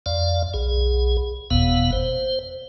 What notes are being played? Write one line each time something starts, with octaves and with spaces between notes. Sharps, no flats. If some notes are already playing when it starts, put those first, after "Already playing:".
F2 D5 F5
B1 G#4
F#1 E2 B2 B3 F5
C5